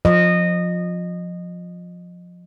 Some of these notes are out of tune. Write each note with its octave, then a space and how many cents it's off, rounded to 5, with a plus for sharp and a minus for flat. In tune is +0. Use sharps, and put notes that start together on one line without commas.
F3 +20 D#5 -20